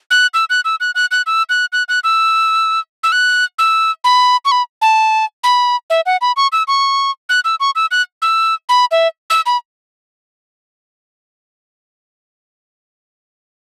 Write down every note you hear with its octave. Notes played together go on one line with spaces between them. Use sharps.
F#6
E6
F#6
E6
F#6
F#6
F#6
E6
F#6
F#6
F#6
E6
E6
F#6
E6
B5
C#6
B5
A5
B5
E5
F#5
B5
C#6
E6
C#6
F#6
E6
C#6
E6
F#6
E6
B5
E5
E6
B5